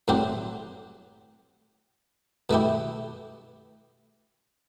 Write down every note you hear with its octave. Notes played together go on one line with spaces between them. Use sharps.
A2 F#3 C4 G4
B2 A3 E4 G4